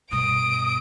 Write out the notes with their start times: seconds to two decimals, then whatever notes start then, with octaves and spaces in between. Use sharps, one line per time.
0.11 G2 B2 D#6 D7